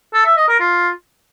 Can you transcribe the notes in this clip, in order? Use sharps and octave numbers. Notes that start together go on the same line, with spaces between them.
A4
E5
D#5
A#4
F4